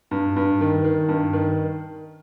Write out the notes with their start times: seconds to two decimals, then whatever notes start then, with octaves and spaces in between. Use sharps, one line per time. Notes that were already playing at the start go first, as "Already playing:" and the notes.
0.11 G2
0.36 G2
0.61 D#3
0.84 D#3
1.08 G2
1.33 D#3